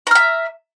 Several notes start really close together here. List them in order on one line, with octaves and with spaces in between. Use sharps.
A#5 F6 E5